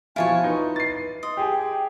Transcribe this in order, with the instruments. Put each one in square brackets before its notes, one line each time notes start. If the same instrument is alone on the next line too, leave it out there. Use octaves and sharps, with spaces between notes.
[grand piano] B2 F3 F4 [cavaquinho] E4 C#5 C#6 [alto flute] G#5
[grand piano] D#4 [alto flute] B4
[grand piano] A6 C7
[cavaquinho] D#5 [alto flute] C6
[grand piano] G4 G#4 [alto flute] G5